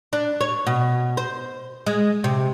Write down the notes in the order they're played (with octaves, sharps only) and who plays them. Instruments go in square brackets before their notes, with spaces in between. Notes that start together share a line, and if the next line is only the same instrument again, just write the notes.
[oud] D4
C#5
B2
C5
G#3
C3